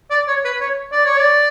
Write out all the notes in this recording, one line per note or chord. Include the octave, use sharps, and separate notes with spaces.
D5
C#5
B4
C#5
D5
C#5
D5